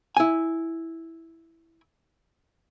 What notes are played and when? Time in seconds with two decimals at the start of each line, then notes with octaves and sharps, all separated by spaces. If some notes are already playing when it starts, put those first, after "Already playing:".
0.17 E4 G#5